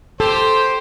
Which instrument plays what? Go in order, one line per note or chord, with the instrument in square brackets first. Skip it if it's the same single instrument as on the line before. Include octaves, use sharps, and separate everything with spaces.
[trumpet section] G4 C5 [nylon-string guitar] A4